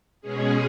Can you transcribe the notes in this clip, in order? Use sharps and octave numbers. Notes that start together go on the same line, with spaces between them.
B2 G#3 C#4 G#4